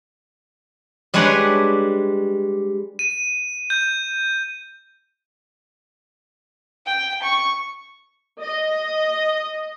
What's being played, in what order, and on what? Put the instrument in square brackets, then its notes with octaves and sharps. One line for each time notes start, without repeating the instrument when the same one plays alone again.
[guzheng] G3 G#3 D4 B4 C#5
[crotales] D#7
G6
[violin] G5
C#6
[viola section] D#5